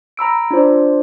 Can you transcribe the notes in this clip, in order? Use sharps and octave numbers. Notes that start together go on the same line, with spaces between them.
A#5 B5 E6 D7
D4 F4 C5 D5